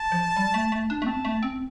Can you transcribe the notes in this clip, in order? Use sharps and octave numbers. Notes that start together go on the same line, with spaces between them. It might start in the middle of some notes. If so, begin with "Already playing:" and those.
Already playing: A5
F3
G3
A3
A3
D4
A3
C4 A5
A3
C4